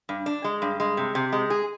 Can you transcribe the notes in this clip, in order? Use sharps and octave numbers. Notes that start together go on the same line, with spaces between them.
G2
D4
G#3
G2
G#3
C3
C3
G#3
G#4